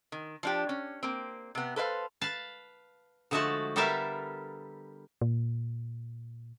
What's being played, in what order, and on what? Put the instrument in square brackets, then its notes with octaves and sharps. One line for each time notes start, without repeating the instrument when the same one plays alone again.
[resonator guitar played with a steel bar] D#3
F3 D4 G4
C#4
A#3 C4
C3 B3
A4 B4 C5 E5 F5
[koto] B4 F5 A5
D3 F3 G#3 A3 F#4 A5
G3 B3 A4 A#4 E5 F5
[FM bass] A#2